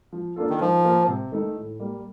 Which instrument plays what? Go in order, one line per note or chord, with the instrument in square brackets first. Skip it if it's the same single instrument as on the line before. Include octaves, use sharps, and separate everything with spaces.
[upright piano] F3
A#3 D4 F4 A4
[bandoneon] D#3
[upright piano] D#3 [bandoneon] F3
[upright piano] A#3 F4 A#4
C3
D#3 A3 D#4
A2
G3 A#3